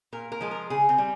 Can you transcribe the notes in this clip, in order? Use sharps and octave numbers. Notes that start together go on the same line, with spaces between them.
A#2 A#4
A#4
F3 G#3
A#4
C#3 G#4
C4
G3